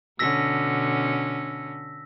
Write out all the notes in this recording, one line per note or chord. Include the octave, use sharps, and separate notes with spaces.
B2 D3 C#4 E6 A#6 B6